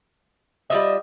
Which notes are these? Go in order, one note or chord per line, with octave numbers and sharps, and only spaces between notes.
G3 F4 D#5 E5